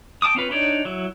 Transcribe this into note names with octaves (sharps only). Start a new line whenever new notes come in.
G5 A5 D6 D#6
C4 C#4 F4 B4
D4 D#4 G4 C#5 D5
F#3 E4